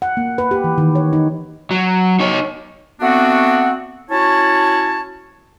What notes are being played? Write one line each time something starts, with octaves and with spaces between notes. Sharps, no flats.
F#5
A#3
B4
G4
E3
D#3
C#5
D#4
F#3
D#4 C#5
A3 B3 C4 D4 F#4
C#4 E4 F#4 C#5 A5